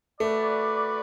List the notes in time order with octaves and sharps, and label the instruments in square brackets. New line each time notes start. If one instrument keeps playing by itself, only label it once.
[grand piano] A3 [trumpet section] F#4 B4 D5